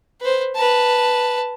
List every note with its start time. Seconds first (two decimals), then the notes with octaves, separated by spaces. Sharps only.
0.21 B4 C5
0.55 B4 A5